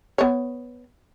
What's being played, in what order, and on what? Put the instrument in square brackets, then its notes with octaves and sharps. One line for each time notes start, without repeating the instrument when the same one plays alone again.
[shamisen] B3 C#5